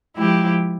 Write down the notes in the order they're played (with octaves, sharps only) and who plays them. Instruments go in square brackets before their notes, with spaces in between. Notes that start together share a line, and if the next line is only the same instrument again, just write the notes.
[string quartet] F3 G#3 E4 G4